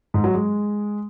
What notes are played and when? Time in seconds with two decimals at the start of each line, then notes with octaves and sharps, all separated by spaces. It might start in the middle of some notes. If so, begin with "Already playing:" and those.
0.14 G#2
0.24 F#3
0.34 G#3